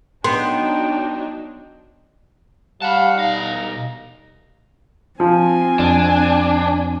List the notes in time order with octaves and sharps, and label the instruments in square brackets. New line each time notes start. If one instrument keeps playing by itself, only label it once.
[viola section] F#3 D4 D#4 [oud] B3 [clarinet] G5 [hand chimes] C6
[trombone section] G3 [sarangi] F5 [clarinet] F#5 [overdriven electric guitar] A5 B5
[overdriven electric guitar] B2 F5 [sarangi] D#4 [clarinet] A#5
[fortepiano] F3 [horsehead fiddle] C4 G#5
[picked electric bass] F2 [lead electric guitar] D4